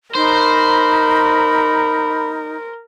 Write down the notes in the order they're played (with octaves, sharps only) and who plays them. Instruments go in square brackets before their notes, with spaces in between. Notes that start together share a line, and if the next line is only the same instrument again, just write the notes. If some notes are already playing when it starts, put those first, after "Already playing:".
[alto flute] D#4 [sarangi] A#4 [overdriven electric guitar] C5 [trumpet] B5